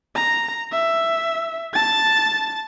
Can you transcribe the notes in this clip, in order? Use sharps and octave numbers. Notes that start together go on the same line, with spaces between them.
A#5
E5
A5 A6